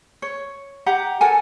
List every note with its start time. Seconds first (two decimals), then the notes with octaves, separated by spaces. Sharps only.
0.22 C#5
0.86 G4 F#5 A#5
1.21 A4 A#4 F#5 G#5